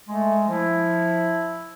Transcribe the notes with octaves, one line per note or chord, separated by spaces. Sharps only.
G#3 A3
F3 E4